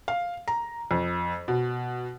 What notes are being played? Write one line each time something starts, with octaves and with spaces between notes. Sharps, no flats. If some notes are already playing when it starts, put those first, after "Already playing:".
F5
A#5
F2
B2